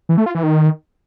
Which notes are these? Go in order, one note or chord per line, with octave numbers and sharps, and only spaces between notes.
E3
A3
F4
E3
D#3